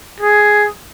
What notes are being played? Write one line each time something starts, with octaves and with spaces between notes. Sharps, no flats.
G#4